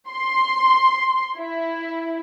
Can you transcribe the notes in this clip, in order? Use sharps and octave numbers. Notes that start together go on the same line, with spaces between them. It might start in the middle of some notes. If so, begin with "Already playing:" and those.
C6
E4